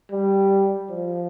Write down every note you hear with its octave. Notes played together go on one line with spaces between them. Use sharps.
G3
F3